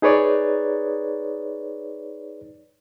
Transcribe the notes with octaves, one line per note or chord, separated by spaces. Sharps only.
D#4 G#4 B4 C#5 D5